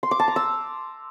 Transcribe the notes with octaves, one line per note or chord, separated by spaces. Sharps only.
C6
D6
A5
A#5
E6